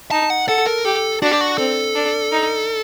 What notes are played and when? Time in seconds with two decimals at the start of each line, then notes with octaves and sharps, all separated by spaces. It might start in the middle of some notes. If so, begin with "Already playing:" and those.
0.11 D#4 A5
0.30 F#5
0.48 A4 F#5
0.66 A#4
0.85 G4 A4
1.22 D4 F#4
1.32 G4
1.41 F#4
1.58 C4 A4
1.95 D4
2.32 D#4